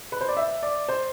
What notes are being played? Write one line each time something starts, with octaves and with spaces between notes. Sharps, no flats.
B4
C5
D5
E5
D5
C5